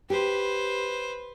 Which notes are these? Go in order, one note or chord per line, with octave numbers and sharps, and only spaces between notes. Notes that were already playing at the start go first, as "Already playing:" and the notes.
G4 B4 C5